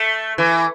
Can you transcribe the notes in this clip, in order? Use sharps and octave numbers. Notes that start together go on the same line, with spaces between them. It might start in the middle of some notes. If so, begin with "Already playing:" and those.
Already playing: A3
E3